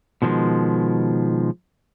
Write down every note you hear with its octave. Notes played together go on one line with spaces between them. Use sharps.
B2 D#3 F3 F#3 G#3